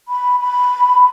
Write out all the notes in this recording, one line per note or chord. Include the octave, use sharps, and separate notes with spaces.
B5
B5